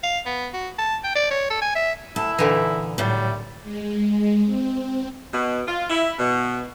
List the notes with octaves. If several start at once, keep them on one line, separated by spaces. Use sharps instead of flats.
F5
B3
F#4
A5
G5
D5
C#5
A4
G#5
E5
D2 E4 A5
A#2 D3 E3 D#4
A2 F#3 G3
G#3
C4
B2
F4
E4
B2